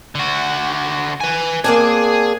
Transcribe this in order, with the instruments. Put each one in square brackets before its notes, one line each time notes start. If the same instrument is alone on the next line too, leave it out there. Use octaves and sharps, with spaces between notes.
[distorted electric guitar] D3 F#4
B4 G#5
[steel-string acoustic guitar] A#3 C4 D4 [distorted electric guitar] G#4